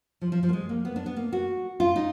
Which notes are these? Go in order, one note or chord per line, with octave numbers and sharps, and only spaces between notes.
F3
F3
F3
A#3
G#3
A#3
B3
D4
B3
A#3
F#4
F4
D#4